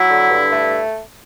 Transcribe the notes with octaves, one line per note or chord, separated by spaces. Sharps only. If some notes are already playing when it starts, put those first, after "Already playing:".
Already playing: F#3 E4
D3
G2
A3